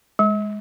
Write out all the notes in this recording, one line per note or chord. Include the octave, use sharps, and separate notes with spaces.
G#3